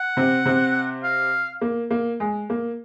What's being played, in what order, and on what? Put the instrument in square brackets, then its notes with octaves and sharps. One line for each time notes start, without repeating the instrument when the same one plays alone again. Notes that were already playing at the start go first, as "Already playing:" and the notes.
Already playing: [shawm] F#5
[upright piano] C3 C4
C3 C4
[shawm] F5
[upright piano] A#3
A#3
G#3
A#3